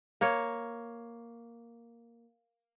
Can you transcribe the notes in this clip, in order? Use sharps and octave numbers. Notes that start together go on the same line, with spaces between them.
A#3 C#5